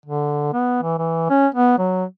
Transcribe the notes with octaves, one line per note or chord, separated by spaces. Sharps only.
D3
B3
E3
E3
C#4
B3
F#3